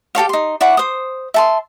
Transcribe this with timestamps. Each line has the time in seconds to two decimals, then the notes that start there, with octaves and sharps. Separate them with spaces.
0.15 G4 A4 C#5 F5
0.29 D#4 C6
0.61 E4 D5 F#5 C#6
0.77 C5 D#6
1.34 E5 A5 C6